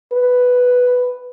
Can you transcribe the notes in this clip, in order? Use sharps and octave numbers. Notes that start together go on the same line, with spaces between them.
B4